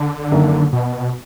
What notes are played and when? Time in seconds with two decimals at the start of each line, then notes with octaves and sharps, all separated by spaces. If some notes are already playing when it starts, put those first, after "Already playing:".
Already playing: D3
0.32 F#2 D#3 F#3 A#3 D4
0.73 B2